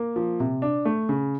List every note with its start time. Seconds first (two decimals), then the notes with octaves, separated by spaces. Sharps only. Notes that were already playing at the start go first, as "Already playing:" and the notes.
Already playing: A#3
0.16 F3
0.40 C3
0.62 D4
0.85 A3
1.09 C#3